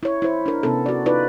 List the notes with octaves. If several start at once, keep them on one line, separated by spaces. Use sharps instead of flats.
E4 C#5
E4 C5
D4 A#4
C3 B3 C#4 A4
F#4 D5
D#4 F4 B4 D5